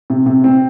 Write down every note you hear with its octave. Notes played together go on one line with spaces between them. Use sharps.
C3
C3
C4